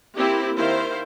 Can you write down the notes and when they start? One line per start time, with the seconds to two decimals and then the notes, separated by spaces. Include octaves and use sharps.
0.17 A#3 C4 E4 G4
0.56 D#3 E4 C5 F5